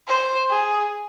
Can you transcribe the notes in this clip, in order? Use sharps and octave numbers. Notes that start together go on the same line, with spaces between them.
C5
G#4